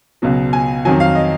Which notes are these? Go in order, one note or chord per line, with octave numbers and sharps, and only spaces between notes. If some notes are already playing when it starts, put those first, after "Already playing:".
C#2 B2 F#3
G#5
F2 D#3 F#3 G#5
F5
D#5